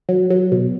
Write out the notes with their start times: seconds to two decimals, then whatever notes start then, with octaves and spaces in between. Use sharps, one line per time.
0.09 F#3
0.30 F#3
0.52 B2